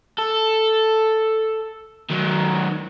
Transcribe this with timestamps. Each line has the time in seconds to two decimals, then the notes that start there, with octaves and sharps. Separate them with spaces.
0.19 A4
2.10 D#3 F#3